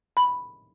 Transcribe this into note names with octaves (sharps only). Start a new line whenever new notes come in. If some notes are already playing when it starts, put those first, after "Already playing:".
B5